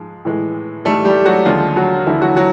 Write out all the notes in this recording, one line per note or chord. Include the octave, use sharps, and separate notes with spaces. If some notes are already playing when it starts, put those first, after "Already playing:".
Already playing: G#2 F3 G#3
A2 E3 G#3
G#2 E3 G3 A3 A4
G3 G4
F#3 F#4
D#2 D3 F3 G#3 F4
F#3 F#4
D#2 D3 E3 F3 E4
F#3 F#4
F#3 F#4